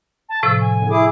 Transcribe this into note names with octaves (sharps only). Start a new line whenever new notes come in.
A5
A2 C3 F3 E6
G#5
E2 D3
E4 G#4 D6